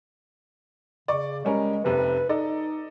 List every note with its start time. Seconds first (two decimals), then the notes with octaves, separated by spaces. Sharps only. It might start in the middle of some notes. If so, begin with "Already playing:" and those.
1.08 C#3 D5 C#6 D6
1.45 G3 G#3 C#4 A#4
1.84 F1 C3 B4
2.29 D#4 A4 D5 D#5